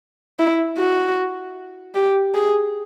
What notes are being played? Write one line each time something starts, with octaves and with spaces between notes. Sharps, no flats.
E4
F#4
G4
G#4